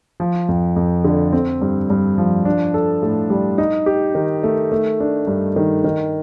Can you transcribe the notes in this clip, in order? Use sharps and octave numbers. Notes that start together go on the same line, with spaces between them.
F3
F2
F2
D3
C4
G2
G2
F3
D4
A4
A2
G3
D#4
G4
D#3
A3
A3
D4
G2
D#3
D#3